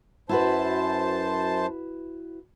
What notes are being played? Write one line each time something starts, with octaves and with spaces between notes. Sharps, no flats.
F#2 E4 F#4 B4 C5 A5